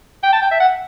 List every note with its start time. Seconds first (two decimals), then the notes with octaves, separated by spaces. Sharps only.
0.23 G5
0.33 A5
0.42 G5
0.52 E5
0.60 F#5